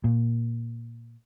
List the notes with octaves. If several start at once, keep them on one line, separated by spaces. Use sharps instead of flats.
A#2